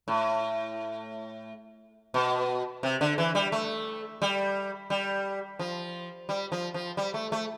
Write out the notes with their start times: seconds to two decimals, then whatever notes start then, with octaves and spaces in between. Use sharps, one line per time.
0.08 A2
2.14 B2
2.83 C3
3.01 D3
3.18 E3
3.35 G3
3.52 A3
4.22 G3
4.90 G3
5.59 F3
6.29 G3
6.52 F3
6.74 F3
6.97 G3
7.14 A3
7.32 A3